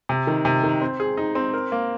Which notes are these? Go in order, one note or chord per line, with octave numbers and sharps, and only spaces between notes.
C3
D#3
C3
D#3
C4
G#4
D#4
C4
A#4
A#3